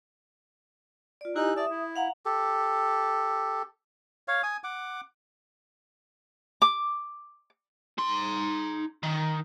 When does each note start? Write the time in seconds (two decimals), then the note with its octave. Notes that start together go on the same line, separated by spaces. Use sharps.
1.21 F4 D5
1.36 D#4 E4 G4 G#5 F#6
1.57 D5 E5 A5 D#6
1.70 E4
1.96 F5 F#5 A#5
2.25 G4 A4
4.28 C#5 F5
4.43 G#5 D#6
4.64 F#5 D6
6.62 D6
7.98 D#4 C6
9.03 D#3